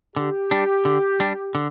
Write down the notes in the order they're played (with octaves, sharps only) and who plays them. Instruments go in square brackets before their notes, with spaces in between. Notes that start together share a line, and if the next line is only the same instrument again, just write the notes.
[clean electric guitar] D3 [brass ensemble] G4
[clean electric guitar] G3 D4
D3
G3 D4
D3